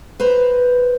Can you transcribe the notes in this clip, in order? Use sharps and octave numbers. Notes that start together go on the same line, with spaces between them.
B4 C5 A#5